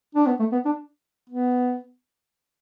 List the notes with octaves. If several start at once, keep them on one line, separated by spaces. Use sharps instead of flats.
D4
B3
A3
B3
D4
B3